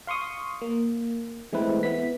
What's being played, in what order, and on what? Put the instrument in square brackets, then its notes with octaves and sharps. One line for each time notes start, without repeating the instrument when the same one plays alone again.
[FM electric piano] F5 C6 C#6 D#6
A#3
E3 G#3 A3 C4 E4 B4
B3 E4 B6